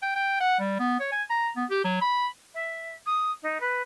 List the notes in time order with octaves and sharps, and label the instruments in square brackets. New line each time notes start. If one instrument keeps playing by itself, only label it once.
[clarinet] G5
G5
F#5
G3
B3
C#5
G#5
A#5
B3
G4
F#3
B5
[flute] E5
D#6
D#4
B4